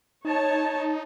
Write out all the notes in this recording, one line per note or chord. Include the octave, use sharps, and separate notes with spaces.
D#4 C#5 A5